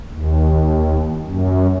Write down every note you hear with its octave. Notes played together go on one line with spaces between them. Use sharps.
D#2
F#2